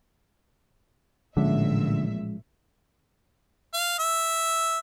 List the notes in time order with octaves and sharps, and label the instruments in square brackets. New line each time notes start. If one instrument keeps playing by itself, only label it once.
[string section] A1 A#2 E5 [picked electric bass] D3 [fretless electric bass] F3 G#3 C#4
[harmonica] F5
E5